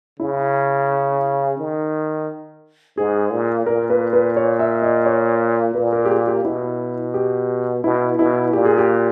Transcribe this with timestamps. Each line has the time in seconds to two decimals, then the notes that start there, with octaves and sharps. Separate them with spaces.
0.19 C#3 E4
1.58 D#3
2.98 G#2 G#4
3.33 A#2
3.66 A#2 A#4
3.90 B4
4.13 B4
4.37 C#5
4.59 E5
4.82 D#5
5.06 C#5
5.75 A#2 B4
5.93 A#4
6.05 G4
6.09 G#4
6.27 G4
6.44 B2 E4
7.14 G4
7.84 B2 E4
8.19 B2 E4
8.53 A#2 G4
8.65 G#4
8.78 G4